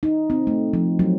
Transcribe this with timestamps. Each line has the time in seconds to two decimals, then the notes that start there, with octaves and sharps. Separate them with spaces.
0.03 D#4
0.30 C4
0.47 A3
0.73 F3
0.99 F#3